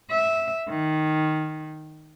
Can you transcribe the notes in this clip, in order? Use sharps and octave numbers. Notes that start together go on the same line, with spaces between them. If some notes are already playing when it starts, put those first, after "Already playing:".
E5
D#3